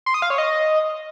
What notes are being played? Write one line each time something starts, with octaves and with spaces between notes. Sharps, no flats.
C6
D#6
F5
C#5
D#5